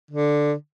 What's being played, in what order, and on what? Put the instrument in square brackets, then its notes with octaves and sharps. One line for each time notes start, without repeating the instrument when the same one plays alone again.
[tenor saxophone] D3